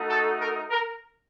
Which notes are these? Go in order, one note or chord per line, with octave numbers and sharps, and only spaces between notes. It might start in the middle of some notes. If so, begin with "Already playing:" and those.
Already playing: A3 D#4 F#4
A4
A#4
A#4